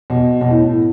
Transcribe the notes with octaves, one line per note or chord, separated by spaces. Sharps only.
B2
B2
A2